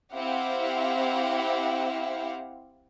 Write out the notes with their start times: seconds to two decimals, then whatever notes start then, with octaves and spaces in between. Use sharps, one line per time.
0.12 C4 E4 G4 F5 F#5